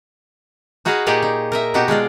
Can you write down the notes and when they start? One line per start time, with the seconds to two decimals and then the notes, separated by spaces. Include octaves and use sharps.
0.85 D#4 F#4 G#4 B4 D#5 F5
1.06 A#2 D#4 G4 G#4 C#5 D5
1.22 D#4
1.52 A#4 D#5 E5
1.74 B2 D#4 F#4 G4 A5
1.88 G#3 D4 F4 D5